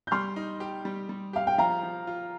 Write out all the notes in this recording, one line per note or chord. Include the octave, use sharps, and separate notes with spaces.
G6
G3 C6 F6
D#4
G4
G3
G3
G4 F5
G5
F3 F5 A#5
F3
F4